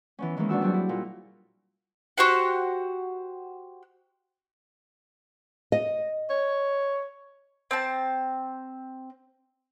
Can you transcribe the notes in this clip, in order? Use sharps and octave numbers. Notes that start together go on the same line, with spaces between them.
E3 B3 C#4
D#3 E3 G#3 A#3 C#4
E2 D4 F#4 E6
F#3 G3 C4 D4 F#4 G#4
E4
A#2
F#4 G4 C5 F#5
D#5
C#5
C4 A5